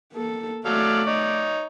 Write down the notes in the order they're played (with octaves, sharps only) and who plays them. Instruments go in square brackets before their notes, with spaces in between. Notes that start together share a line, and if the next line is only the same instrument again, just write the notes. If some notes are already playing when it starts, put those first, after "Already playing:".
[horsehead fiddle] A#3 A4
[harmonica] F#3 A4 F5 [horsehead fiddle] A3 D5
[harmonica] D#4 C#5